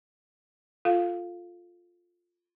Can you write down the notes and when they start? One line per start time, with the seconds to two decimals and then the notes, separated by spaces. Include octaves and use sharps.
0.85 F4 A4 F5